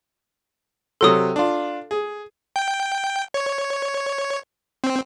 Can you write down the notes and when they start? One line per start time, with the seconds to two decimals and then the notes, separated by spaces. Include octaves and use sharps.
1.01 C3 F#3 A4 C6 D#6
1.36 D4 F4
1.91 G#4
2.56 G5
3.34 C#5
4.84 C4